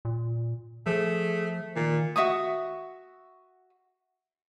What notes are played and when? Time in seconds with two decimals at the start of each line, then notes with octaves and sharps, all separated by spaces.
0.05 A#2
0.86 F3 A3 G#4
1.76 A#2 D#3
2.16 F#4 E5 C#6 D#6